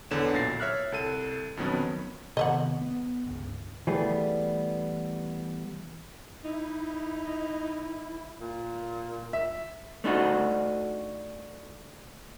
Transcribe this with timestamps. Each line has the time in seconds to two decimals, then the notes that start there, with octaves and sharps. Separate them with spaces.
0.11 E2 D3 B3 C#5 E7
0.33 B1 A#2 A6 A#6 C7
0.60 C#5 E5 F6 F#6
0.92 C2 A4 D#7
1.57 F2 B2 D#3 F#3 B3 C#4
2.37 C3 D#3 B3 D#5 E5 F#5
2.81 B3
3.27 G1 C#2
3.87 E3 G3 A3 B3 G#4
6.45 D#4 E4
8.40 A#2
9.33 E5
10.04 A3 D4 D#4 F#4